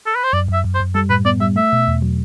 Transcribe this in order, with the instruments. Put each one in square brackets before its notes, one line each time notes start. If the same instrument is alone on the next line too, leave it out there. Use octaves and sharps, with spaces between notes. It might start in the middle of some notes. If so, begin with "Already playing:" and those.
[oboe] A4
B4
C5
[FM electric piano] F#2 [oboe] D5
[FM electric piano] F#2
[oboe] E5
[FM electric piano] F#2
[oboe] C5
[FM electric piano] F#2
[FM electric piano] G3 [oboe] A4
[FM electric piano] A2 [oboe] B4
[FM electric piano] B3 [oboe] D5
[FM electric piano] G3 [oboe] E5
[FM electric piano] A3 [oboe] E5
[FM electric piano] B2
E2
F#3